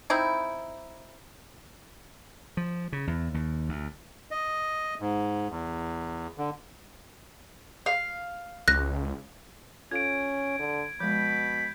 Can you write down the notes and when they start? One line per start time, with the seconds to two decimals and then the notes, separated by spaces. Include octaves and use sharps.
0.10 C4 D#4 E4
2.57 F3
2.92 C#3
3.07 E2
3.34 D#2
3.69 D2
4.31 D#5
5.00 G#2
5.50 E2
6.38 D3
7.86 F5
8.68 C#2 F#6 A#6
9.91 C#4 F4 A4 F5 G#6 D7
10.59 D3
11.00 B2 F3 G#3 B5 G6